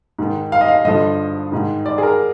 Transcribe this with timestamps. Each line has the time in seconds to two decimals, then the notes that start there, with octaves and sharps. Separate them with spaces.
0.19 G#2 D#3
0.52 F5
0.61 D#5
0.68 F5
0.85 G2 D3 F3 D#5
1.52 G#2 D#3
1.86 D5
1.98 G#4
2.03 A#4